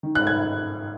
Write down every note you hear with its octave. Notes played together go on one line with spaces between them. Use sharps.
D#3
F#6
G#2
G#6